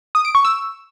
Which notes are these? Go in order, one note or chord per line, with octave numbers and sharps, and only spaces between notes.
D#6
D7
C#6
E6